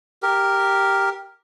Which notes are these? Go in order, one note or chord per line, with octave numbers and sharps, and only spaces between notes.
G4 A#4